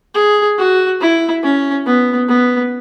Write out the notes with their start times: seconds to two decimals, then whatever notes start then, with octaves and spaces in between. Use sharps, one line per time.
0.15 G#4
0.58 F#4
1.01 E4
1.43 C#4
1.86 B3
2.28 B3